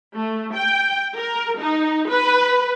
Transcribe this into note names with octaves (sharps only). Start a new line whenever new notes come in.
A3
G5
A#4
D#4
B4